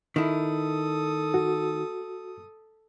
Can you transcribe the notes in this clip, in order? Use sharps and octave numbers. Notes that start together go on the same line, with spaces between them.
D#3 E4 A4 D#6
F#4